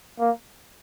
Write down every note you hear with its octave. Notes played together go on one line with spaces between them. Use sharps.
A#3